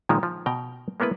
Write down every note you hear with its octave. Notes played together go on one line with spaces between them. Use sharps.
A#2 D#3 F3 G#3
F3
B2 G5 A#5
G#3 A#3 B3 E4 B4